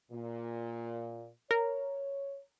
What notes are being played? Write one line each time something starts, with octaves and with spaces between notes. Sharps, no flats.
A#2
A#4 C#5